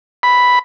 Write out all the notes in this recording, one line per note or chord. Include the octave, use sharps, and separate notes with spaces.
B5